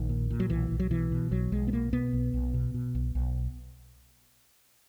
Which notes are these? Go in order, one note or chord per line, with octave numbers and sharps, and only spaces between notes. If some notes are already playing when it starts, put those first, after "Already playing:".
Already playing: A#1 D#3
A#2
A#2
F#3
B1 E3
B1
F#3
B2 E3
B2
B1 F#3
B1 G#3
B3
B2 A#3
B2 B3
B1
B1
B2
B2
B1
B1